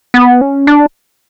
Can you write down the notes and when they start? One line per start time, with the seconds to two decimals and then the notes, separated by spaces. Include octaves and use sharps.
0.14 B3
0.41 C#4
0.67 D4